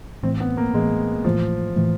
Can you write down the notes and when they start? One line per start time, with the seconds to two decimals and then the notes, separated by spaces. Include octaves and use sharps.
0.23 A2 E3 A3 C4
0.40 B3
0.57 A#3
0.73 A2 E3 G#3 A3
1.24 A2 E3 F3 A3
1.76 A2 E3 A3